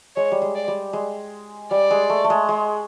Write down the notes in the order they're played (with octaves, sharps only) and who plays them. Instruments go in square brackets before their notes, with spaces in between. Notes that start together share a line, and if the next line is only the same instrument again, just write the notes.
[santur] G#3 [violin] C#5
[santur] G3
G#3
[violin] D5
[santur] G3
G#3
[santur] G3 [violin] D5
[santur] G#3
A3
A3
G#3
G#3